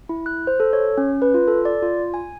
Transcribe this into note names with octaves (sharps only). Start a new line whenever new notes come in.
E4
F#6
C5
A4
C#5
C#4
B4
F4
A4
D5
F4
G#5